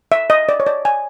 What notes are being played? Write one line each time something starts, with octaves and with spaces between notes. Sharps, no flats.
E5
D#5
D5
C#5
D5
G#5